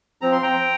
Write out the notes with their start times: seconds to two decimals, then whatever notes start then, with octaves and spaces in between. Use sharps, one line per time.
0.21 F3 C4 A#5
0.32 C6
0.42 G5 A#5